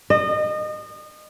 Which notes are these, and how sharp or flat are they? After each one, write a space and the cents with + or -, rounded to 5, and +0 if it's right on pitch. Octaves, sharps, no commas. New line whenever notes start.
D#5 -30